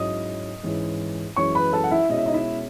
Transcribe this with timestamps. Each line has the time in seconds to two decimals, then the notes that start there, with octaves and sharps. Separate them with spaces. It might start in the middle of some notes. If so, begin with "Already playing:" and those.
Already playing: G#2 F#3 C#4 E4 D#5 D#6
0.63 G#2 E3 G#3 C#4 E4
1.36 F#2 E3 G#3 C#4 E4 C#5 C#6
1.55 B4 B5
1.73 A4 A5
1.84 F#5
1.91 E4 E5
2.09 B2 G#3 C#4 E4 D#5
2.18 E5
2.26 D#4 D#5
2.34 E4 E5